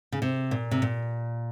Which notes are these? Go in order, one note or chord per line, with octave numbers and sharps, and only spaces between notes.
C#3
C3
A#2
C3
A#2